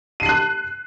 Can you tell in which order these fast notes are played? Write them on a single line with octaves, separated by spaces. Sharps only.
D#7 C7 F#7 F#6